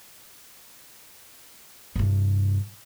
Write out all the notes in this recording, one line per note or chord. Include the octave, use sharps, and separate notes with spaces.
G2 C3